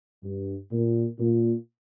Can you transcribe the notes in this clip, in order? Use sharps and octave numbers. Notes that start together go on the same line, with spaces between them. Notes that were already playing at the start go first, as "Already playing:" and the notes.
G2
A#2
A#2